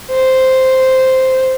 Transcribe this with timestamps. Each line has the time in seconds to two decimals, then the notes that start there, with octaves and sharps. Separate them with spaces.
0.10 C5